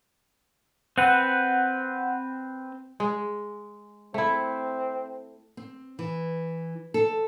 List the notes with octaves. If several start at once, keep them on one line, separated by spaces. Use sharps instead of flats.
C4 B4 F#5
G#3
A3 C4 E4
C4
E3
A4